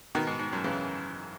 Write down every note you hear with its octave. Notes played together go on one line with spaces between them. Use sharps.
B2 D#3
G#2
G#2
F#2
C#3 E3